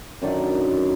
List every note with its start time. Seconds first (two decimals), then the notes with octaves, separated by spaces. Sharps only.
0.22 F#2 D3 D#3 D5